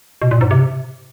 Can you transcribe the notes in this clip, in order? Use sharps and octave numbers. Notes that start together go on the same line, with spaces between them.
B2
A#2
G#2
C3